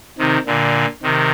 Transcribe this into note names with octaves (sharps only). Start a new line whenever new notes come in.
C3 D#3
A#2 D3
C3 D#3